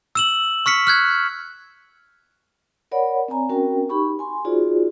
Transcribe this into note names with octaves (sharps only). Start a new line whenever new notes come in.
E6 E7 F#7
C#6 F6 B6 C#7
F6 F#6 G#6
A#4 C#5 D5 F#5 B5
C4 D5 G#5 A#5
C4 C#4 F#4 A#4 G5
D#4 G4 B5 C#6
G#5 C6
D#4 F4 F#4 G#4 C5 D5